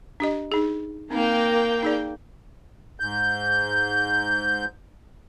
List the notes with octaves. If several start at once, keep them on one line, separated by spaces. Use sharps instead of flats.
D4 G4 D#5
D#4 G#4
A#3 C4 D#4 G5
D#4 G#4 D5
G#2 G6